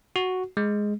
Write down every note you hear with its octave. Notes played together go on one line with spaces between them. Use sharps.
F#4
G#3